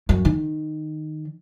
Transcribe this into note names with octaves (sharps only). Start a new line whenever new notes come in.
F#2
D#3